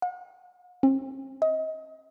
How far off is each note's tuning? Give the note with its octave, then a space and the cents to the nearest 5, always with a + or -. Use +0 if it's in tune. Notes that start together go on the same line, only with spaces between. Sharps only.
F#5 -45
C4 +40
D#5 +25